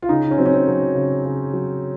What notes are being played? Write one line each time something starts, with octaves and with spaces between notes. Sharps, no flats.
F4
C#3 D#4
C#4
F#3 C4
C#4
C4
F#3
C#3
C#3
F#3